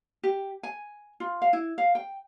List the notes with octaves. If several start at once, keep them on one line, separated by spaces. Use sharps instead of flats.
G4
G#5
F4
F5
E4
F5
G5